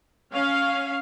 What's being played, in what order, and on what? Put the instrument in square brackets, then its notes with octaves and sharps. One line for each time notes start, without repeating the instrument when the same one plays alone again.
[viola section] C#4 F5